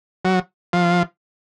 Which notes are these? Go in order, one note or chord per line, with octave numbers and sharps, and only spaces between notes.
F#3
F3